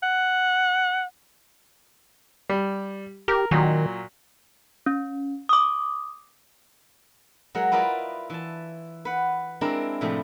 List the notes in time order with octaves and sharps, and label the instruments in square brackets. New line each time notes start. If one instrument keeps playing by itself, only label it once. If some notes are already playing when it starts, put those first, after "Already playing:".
[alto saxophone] F#5
[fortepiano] G3
[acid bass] G4 [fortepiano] A#4
[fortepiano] A#2 F#3 [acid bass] D#3
[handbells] C#4
D6 D#6
[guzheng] F#3 G#3 A#4 F#5
E4 F4 A#4 B4 D5 D#5
E3 A5
B4 F#5
G#3 C4 D4 E4 A#4
A2 C3 F3 G3 A3